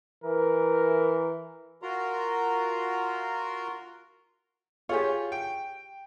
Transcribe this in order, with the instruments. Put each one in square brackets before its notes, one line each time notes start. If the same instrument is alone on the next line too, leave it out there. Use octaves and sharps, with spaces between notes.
[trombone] E3 [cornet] A#4
[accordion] F4 F#4 A#4 A#5 C6
[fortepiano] F4 [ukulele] G4 G#4 C#5
[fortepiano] G5